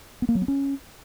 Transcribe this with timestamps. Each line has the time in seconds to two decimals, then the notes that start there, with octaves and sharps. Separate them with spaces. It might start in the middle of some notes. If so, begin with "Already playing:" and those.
0.22 B3
0.29 A#3
0.35 F#3
0.42 B3
0.48 C#4